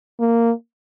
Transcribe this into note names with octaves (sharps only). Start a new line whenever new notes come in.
A#3